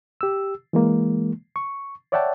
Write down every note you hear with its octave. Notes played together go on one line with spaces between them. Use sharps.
G4 E6
E3 G#3 A#3
C#6
C#5 D5 E5 F#5 G5 A5